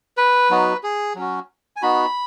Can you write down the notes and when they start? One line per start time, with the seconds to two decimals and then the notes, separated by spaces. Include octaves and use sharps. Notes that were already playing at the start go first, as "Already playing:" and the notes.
0.17 B4
0.50 F#3 B3 D#4 F#4
0.83 G#4
1.16 F#3 C#4 F#4
1.76 G#5
1.82 B3 D#4 F#4 B5